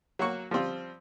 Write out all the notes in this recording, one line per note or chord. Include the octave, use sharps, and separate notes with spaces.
F#3 A#3 F#4 C#6
F3 G3 C4 F4